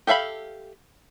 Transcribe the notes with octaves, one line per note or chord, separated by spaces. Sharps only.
G4 A4 E5 F5 B5